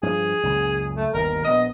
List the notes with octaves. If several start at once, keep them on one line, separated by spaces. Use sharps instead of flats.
G2 F3 G#4
C#2 F#2 A#2
A3
G1 D#2 A#4
A#1 B3 D#5